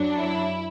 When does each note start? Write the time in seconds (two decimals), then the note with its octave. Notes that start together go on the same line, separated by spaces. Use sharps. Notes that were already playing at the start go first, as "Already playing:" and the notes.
Already playing: F#2 F#3 D4
0.17 E4